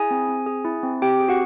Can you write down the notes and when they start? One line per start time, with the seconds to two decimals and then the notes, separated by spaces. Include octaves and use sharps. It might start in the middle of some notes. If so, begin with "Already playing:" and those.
Already playing: E4 G#4 G#5
0.11 C4
0.29 C4
0.46 G#4
0.65 E4
0.83 C4
1.02 C4 G4 G5
1.20 G#4
1.29 F#4 F#5